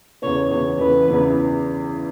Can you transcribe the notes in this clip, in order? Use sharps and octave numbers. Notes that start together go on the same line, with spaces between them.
E2 C#3 E3 B3 C#5
E2 C#3 E3 B3 C#5
E2 C#3 E3 B3 B4
E2 C#3 E3 B3